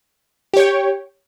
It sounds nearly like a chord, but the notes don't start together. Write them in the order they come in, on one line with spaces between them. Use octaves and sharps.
G4 C#5 G5